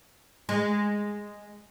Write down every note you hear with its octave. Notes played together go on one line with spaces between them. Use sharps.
G#3